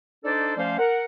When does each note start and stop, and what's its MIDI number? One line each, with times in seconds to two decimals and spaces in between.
0.25 0.57 62
0.25 0.57 63
0.25 0.57 69
0.25 0.57 72
0.25 0.57 74
0.57 0.76 53
0.57 0.76 57
0.57 0.76 61
0.57 0.76 72
0.57 0.76 74
0.57 0.76 77
0.79 1.03 70
0.79 1.03 78